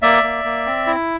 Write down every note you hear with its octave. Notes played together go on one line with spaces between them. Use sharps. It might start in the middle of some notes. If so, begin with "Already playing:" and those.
A#3 D5 E5
A#3
A#3
C4
E4